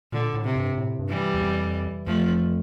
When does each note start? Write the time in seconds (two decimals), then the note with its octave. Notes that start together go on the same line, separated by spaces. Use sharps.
0.12 A#2 D3
0.34 A2
0.45 C3
0.56 G2
0.77 A2
0.99 G2
1.09 E3 G3
1.34 E2
1.42 F2
2.06 F2 F3 A3